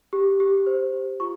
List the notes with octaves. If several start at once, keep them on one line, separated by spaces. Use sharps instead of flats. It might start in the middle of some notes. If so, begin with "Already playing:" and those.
G4
G4
C5
G4
F4 C#6